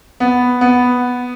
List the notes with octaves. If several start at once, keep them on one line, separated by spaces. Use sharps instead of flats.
B3
B3